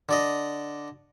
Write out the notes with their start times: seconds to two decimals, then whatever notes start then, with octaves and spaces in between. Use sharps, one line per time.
0.09 D3 D5 D#5